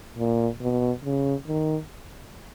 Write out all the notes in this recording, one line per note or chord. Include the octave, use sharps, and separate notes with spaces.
A#2
B2
C#3
D#3